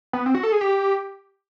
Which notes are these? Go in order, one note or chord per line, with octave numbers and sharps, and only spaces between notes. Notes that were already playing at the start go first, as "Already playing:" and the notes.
B3
C4
F#4
A4
G#4
G4